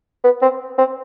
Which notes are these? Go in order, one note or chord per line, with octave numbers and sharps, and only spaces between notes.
B3
C4
C4